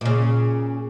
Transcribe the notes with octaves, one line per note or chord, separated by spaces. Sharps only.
A#2 C#3